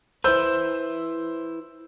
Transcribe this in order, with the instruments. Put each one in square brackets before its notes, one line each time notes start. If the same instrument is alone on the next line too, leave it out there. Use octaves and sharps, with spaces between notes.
[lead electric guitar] E4 B4 [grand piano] C5 E6 G6